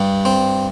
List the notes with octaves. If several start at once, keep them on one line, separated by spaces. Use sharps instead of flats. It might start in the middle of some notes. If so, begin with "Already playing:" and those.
Already playing: G2 G3
C4